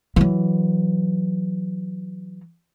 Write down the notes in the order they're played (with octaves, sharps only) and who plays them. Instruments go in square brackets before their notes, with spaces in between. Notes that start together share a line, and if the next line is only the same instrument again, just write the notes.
[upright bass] E3 F#3